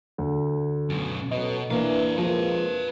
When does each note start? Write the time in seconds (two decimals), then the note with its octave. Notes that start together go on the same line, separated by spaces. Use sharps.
0.18 D2
0.90 F#2 B2
1.31 B2 F#3 A4 B4 D#5
1.71 E3 A#3 D4 B4 F5
2.18 C3 F3 G#3 A#3 B4 F5